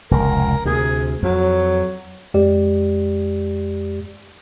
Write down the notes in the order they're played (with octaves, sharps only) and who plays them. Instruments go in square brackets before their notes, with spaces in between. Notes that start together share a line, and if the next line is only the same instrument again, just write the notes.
[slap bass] F1 C#2 [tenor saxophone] A#4
[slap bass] D2 C3 [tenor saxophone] G#4
[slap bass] F2 [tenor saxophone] F#3
[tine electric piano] F2 G#3 G4 D5